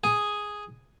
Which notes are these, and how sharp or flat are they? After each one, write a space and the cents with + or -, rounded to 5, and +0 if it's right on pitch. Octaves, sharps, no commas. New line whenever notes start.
G#4 +0 G#5 +0